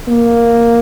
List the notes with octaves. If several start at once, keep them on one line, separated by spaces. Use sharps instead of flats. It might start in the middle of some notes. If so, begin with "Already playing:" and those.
A#3